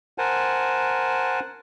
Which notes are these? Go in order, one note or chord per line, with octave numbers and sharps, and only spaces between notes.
A#4 C5 F#5 G#5 A5